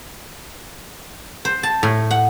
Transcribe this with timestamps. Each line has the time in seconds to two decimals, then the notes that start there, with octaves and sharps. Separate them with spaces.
1.45 C5
1.63 A5
1.83 A2
2.11 F#5